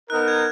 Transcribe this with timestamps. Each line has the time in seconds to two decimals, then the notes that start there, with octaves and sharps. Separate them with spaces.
0.10 B3 D#4 A#4 F#6
0.28 G#6